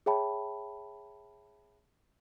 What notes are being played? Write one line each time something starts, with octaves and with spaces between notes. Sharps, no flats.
G#4 C#5 E5 G5 A5 B5